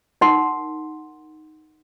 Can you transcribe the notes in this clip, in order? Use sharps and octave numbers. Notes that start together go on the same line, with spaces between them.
D#4 A#4 F#5 C6